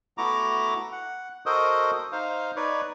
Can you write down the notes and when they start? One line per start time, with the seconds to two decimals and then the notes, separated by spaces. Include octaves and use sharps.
0.18 A3 B3 E4 F#4 A#5 D6
0.92 F#5
1.46 F#4 A4 A#4 C5 D#5 D#6
2.12 D#4 C5 F5
2.56 D#4 B4 C#5 D5